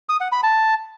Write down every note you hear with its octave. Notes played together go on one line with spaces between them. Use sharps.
D#6
F#5
B5
A5